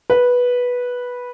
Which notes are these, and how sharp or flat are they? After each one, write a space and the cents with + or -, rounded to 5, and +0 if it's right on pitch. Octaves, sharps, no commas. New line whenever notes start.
B4 -10